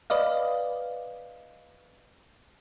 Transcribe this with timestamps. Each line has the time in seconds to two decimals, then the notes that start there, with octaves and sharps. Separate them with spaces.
0.10 B4 D5 D#5 F5